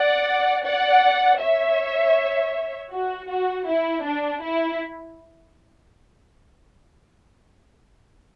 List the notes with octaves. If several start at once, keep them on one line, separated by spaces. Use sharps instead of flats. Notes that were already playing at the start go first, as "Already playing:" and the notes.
Already playing: D5 F#5
D5 F#5
C#5 E5
F#4
F#4
E4
D4
E4